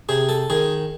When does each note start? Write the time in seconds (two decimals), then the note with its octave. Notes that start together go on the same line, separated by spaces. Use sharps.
0.09 C3 G#4
0.29 A4
0.50 D#3 G#4